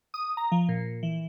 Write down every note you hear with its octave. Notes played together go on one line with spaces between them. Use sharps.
D#6
A#5
F3
A#2
E3